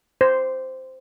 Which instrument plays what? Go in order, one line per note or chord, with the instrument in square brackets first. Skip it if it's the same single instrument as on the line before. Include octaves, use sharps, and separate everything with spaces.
[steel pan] C5